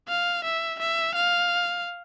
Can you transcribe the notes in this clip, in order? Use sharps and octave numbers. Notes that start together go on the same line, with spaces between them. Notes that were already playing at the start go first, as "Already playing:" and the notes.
F5
E5
E5
F5